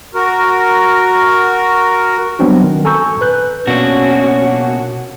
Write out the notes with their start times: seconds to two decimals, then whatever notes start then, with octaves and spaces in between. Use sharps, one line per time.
0.14 F#4 A#4
2.39 F#3 G3 B3 C4 D4 F#4
2.63 D#3
2.85 A4 G#5 A#5 C#6 E6 G6
3.21 B4 F#6 G6
3.67 B2 A#3 C#4 D4 F#4